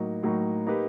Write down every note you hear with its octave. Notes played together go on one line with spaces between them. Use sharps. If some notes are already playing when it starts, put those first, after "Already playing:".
Already playing: A2 F#3 A#3 D#4
A2 F#3 A#3 D#4
A#3 D#4 G4 B4